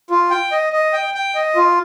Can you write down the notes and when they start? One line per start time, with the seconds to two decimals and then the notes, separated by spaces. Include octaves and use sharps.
0.10 F4
0.31 G5
0.52 D#5
0.73 D#5
0.93 G5
1.14 G5
1.35 D#5
1.56 F4